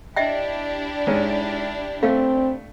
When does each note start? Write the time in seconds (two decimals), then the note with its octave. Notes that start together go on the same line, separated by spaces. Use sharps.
0.16 D4 E4 G4 D#5 E5 G5
1.07 G#2 C#4
2.03 A3 C4 F5